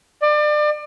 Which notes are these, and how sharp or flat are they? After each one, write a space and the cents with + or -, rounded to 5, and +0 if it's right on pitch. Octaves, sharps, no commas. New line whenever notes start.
D5 +30